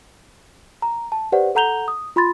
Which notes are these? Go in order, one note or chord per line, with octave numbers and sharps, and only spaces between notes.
A#5
A5
G4 B4 C5 D5 F#5
A4 F#5 A#5 G6 F7 G7
D#6
F4 B5 C6 A6